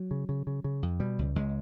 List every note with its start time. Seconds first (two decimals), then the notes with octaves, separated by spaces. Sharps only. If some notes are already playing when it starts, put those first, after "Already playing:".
Already playing: F#3
0.11 C#3
0.29 C#3
0.47 C#3
0.64 C#3
0.83 F2
1.00 B2 G3
1.19 C#2
1.35 C#2 G#3